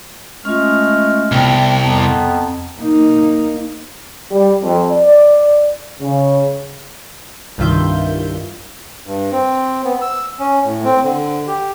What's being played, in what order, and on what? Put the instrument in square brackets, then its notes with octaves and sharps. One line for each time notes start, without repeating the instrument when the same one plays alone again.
[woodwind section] G#3 A3 F6 [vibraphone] C#4 F4
[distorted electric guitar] C2 [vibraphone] B3 G5 A5
[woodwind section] F2 B3 [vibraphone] A5 A#5
[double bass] A#3 D#4
[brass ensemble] G3
F2
D5
C#3
[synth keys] C2 G2 D#3 F4 E5 G6
[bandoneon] G2
C4
B3
E6
C#4
A2
C4
D3
G4